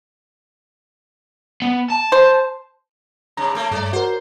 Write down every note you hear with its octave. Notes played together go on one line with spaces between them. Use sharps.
B3
A5
C5
G2 C3 A#5
A3 A#3
G2 G#3 C#5 D5
F#4 A#4 C5